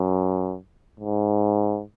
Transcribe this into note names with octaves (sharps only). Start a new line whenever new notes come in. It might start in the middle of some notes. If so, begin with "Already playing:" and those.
Already playing: F#2
G#2